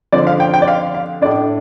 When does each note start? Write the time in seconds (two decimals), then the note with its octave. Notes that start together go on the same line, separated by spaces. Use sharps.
0.12 D3 F3 C4 D5
0.27 F5
0.40 G5
0.54 G5
0.62 D5
0.68 F5
0.95 F5
1.22 A2 A3 D4 D5